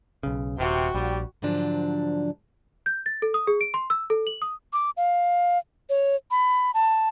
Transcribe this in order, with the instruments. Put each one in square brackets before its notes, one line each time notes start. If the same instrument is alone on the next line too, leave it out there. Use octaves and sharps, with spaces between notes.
[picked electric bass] B1 C#3
[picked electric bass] D#1 [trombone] C3 [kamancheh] F#4 G5
[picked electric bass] A#1 [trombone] G3
[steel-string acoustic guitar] G#2 D3 F3 F#3 D4
[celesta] G6
A6
A4
D#6
G#4
D7
C6
E6
A4
F#7
D#6
[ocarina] D6
F5
C#5
B5
A5